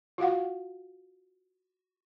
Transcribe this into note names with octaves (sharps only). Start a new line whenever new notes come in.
F4 F#4 F5 F#5